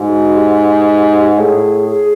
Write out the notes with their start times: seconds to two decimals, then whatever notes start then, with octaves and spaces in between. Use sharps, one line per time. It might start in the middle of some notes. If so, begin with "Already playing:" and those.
Already playing: G#2 F#4
0.35 G4
1.37 A2 G#4
1.90 G#4